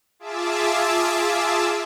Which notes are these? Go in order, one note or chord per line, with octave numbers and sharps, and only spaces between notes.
F4 G#4 E5 A5 D6 E6